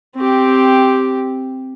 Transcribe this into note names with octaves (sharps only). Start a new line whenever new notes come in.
C4 G4